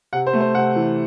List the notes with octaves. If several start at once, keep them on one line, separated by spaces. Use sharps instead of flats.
C3 F#5
C5
A3
C5
C3 F#5
E3